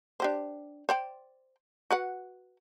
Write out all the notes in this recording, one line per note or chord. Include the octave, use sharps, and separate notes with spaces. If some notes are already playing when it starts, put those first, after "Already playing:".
D4 G4 C5
C5 D5 G5
F#4 B4 F#5